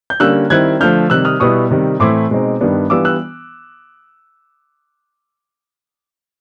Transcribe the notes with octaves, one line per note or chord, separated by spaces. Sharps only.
G6
D3 G3 A#3 C#4 E6 F#6
D#3 G3 C4 E4 F#6 G#6
D3 F3 A3 F6 G6
C3 D#3 G3 E6 F#6
D#6 F6
B2 G3 B3 E4 C#6 D#6
C3 D#3 G3
A2 E3 A3 C4 E4 C6 D6
B2 G#3 C4 D#4
G2 D#3 G3 B3 D4
E3 G3 B3 D4 F4 D6 E6
E6 F#6